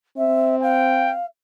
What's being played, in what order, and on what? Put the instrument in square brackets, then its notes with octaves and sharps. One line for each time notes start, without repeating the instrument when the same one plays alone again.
[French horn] C4 [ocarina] E5
[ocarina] F5 [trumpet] G5